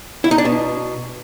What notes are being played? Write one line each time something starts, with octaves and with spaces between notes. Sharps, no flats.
E4
D#4
D4
B2